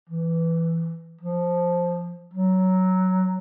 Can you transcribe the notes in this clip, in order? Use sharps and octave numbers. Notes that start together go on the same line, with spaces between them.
E3
F3
F#3